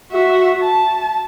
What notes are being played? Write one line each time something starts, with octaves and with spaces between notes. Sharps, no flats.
F#4 E5
A5